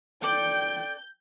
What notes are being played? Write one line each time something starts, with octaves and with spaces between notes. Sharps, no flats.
A4 D5 G5 G6